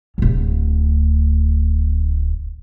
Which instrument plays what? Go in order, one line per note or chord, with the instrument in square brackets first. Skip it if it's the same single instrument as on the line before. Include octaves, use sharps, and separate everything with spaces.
[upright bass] D1 D2